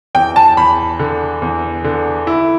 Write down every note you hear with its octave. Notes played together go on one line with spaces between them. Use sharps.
E2 G5
A5
E2 B5
D3
E2
D3
E4